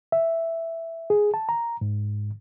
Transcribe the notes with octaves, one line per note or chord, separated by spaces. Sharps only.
E5
G#4
A5
A#5
G#2